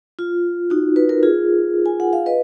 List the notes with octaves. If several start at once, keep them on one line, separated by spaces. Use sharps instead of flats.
F4
D#4 F#4
B4
A#4
F4 G#4
G#5
F#5
F5
B4 D#5